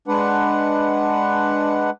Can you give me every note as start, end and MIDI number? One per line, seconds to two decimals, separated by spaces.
0.08 1.90 56
0.08 1.90 62
0.08 1.90 71
0.08 1.90 78